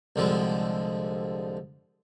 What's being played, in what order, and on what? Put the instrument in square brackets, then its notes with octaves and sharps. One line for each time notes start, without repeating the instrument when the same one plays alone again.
[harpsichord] C2 D3 F3 G#3